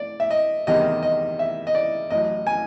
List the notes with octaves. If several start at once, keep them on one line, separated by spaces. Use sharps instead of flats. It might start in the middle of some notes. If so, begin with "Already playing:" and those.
Already playing: D5
E5
D#5
E2 C3 D#3 G3 D#5
D#5
E5
D#5
D5
A1 A2 F#3 D#5
G#5